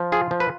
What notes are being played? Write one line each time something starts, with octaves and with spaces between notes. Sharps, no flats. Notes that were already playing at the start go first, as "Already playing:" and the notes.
Already playing: F3
F4 G#4
F3
B4